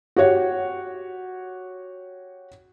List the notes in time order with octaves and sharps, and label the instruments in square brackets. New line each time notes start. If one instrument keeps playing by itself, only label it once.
[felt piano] F#4 G4 C#5 F#5